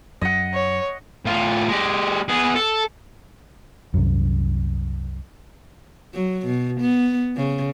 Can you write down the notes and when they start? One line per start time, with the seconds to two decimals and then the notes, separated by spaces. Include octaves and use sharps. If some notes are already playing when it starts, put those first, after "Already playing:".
0.21 F#2 F#3 D#5 F#5
0.54 C#5
1.26 A2 F4
1.68 G#3 G4
2.28 B3 G#4
2.56 A4
3.94 C2 F#2
6.14 F#3
6.46 B2
6.80 B3
7.36 C#3